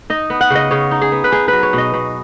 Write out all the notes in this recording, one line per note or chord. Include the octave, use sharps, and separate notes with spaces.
D#4 D#5
B3
F#5
C#3 D#5
C#3 C#5
D#4
G#4
B3
B4
D#4 G#4
F#3 B4
C#5
B2 D#5
B2